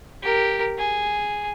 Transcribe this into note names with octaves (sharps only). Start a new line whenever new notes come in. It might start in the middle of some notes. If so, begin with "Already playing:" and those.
G4 A#4
G#4